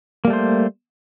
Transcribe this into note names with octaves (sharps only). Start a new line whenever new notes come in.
G3 A3 A#3 C5